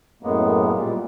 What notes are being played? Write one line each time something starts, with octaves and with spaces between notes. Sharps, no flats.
F#2 A2 G#3 A#3 B3
A#2 G3